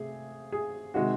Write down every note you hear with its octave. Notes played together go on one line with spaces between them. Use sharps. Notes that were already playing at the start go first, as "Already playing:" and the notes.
Already playing: C3 A3 G#4
G#4
C3 D#3 G#3 F#4